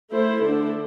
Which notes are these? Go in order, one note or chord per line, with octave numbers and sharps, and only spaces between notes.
A3 E4 A4 C5
D3 A3 D4 A4